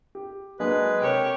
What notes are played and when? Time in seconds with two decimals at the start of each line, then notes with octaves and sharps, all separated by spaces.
0.15 G4
0.60 F#3 G#3 A#3 D4 B4
1.00 C3 G4 A#4 C5 C#5